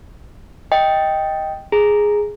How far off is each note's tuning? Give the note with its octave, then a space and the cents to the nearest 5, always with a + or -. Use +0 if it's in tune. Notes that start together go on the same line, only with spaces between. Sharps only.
D#5 +10 G5 +0
G#4 +0 A#5 +0